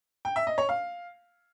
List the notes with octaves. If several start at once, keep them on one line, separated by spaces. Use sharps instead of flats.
G5
E5
D#5
C#5
F5